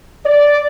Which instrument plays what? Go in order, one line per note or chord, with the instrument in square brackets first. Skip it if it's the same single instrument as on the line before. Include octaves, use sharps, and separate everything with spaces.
[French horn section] D5